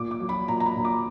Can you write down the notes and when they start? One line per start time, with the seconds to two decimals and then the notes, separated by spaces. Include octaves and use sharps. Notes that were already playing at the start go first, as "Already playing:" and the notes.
Already playing: A#2 D6
0.11 D6
0.20 F#3
0.29 B5
0.48 A#2 A#5
0.60 A#5
0.66 B5
0.76 A#2
0.85 D6